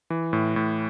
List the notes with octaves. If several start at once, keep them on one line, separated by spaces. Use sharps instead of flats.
E3
A2
A2